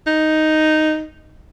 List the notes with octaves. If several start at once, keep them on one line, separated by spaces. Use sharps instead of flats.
D#4